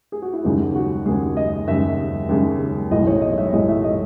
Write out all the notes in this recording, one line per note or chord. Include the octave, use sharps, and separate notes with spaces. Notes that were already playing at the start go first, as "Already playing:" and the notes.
G#4
F#4
E4
D#2 C#3 G#3 D#4
F#4
D#2 C#3 G#3 G#4
D#5
D#2 C#3 G#3 E5
D#2 C#3 G#3
B1 A2 E3 G#3 D#5
C#5
D#5
E5
B1 A2 E3 G#3 D#5
E5
D#5